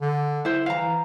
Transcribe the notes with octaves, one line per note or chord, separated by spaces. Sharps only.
D3
E4 C5
E3 F5 A#5